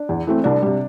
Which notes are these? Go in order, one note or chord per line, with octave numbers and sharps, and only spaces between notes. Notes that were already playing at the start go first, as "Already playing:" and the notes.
Already playing: D4
E2
E3 A3 C4
C2 D4
C3 G3